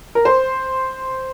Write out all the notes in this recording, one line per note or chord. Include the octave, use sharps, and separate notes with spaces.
A#4
C5